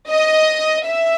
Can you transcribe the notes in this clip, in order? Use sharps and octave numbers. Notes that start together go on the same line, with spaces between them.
D#5
E5